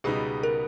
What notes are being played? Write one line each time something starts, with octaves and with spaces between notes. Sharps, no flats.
C#2 B2 G3 B3 D#4 G#4
A#4